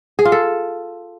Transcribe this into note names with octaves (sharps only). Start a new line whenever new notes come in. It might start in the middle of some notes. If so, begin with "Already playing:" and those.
G#4
F4
A4